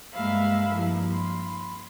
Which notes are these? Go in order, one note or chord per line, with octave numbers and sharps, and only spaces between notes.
G2 G#3 A#3 E5 F5 B5
G2 F3 A#3 E4
B5 C6